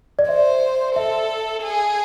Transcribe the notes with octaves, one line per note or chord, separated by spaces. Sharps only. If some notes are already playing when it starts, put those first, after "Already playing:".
D5
C5 E5
A4 E5
G#4